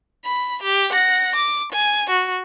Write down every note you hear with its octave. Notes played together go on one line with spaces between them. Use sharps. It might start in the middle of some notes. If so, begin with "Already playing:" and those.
B5
G4
F#5 A#6
D6
G#5
F#4